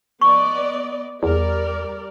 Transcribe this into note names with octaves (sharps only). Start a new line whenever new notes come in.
B3 D5 D#5 C#6
E2 G3 A#4 D5